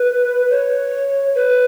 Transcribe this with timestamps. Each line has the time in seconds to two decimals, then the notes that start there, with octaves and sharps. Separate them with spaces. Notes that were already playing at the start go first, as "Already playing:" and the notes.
Already playing: B4
0.50 C#5
1.35 B4